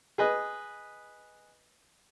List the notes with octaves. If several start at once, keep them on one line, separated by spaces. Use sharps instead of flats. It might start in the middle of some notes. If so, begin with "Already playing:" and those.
G#4 B4 D#5